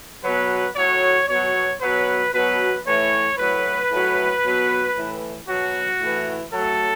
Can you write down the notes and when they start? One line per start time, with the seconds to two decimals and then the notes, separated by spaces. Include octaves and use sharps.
0.24 B2 F#3 B4
0.76 A2 F#3 C#5
1.28 B2 F#3 C#5
1.82 B2 F#3 B4
2.33 B2 F#3 B4
2.86 A2 E3 C#5
3.38 A2 F#3 B4
3.90 A2 F#3
4.44 B2 F#3
4.96 A2 E3
5.48 B2 F#3 F#4
6.00 A2
6.05 E3
6.52 A2 F#3 A4